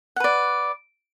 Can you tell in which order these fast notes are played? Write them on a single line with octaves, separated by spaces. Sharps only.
F#5 B4 D5